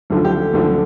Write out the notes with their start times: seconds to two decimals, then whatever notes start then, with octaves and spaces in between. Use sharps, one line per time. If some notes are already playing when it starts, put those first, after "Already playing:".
0.10 D2 D3 F3
0.25 G4
0.53 D2 D3 F3